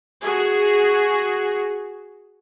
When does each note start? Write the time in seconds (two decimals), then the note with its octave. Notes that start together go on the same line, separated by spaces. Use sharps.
0.22 F#4 G#4